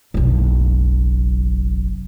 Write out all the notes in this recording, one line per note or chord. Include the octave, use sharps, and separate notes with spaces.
F#1 B1